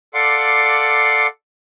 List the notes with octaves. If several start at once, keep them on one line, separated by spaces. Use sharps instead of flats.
A4 D5 F5 F#5 C6 D6